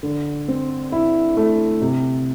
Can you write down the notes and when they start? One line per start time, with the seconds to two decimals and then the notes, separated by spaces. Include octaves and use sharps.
0.03 D3
0.48 C4
0.92 E4
1.37 A3
1.82 C3